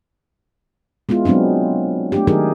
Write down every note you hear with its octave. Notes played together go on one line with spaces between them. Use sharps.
G#3 B3 E4 F4
F#3 G#3 B3 C4 D4
A3 D4 G4
D#3 F#3 D#4 G4 G#4 A#4